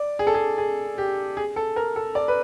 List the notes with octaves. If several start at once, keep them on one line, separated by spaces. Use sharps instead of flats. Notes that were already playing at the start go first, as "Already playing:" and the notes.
Already playing: D5
G#4
A4
G#4
G#4
G4
G#4
A4
A#4
A4
D5
B4